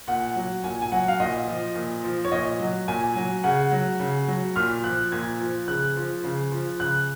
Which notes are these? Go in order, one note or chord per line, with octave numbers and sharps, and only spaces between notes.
A#2 F#5
F#3
A#2 G#5
G#5
F#3 F#5
F5
A#2 D#5
F3
A#2
F3
C#5
A#2 D#5
F#3
A#2 G#5
F#3
C#3 F#5
F#3
C#3
F#3
A#2 F6
F3 F#6
A#2 G#6
F3
C#3 F#6
F3
C#3
F3
C#3 F#6